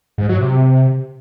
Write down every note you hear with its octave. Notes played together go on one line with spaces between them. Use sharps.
G#2
F#3
C3